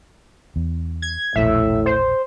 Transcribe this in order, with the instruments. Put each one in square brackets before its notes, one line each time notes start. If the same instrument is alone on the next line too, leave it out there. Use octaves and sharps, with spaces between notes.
[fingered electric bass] E2
[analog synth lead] G#6
[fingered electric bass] E1 A#1 [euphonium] A2 [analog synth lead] E5
[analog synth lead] C5